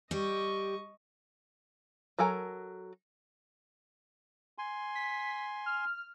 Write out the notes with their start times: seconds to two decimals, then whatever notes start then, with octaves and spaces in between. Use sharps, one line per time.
0.11 G3 G4 D#5 C#6
2.19 F#3 A4 A#4 G#5 A#5
4.58 G#5 C6
4.95 B6
5.66 F6